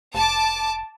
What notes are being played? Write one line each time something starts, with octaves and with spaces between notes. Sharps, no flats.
F1 A5 D6